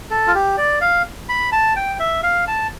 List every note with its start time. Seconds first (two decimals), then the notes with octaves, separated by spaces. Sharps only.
0.11 A4
0.27 F4
0.35 G4
0.57 D5
0.81 F5
1.29 B5
1.52 A5
1.76 G5
2.00 E5
2.23 F5
2.48 A5